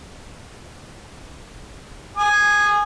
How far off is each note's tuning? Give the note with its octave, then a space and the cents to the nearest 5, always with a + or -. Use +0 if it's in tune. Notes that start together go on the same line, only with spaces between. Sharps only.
G#5 +0 D#6 -30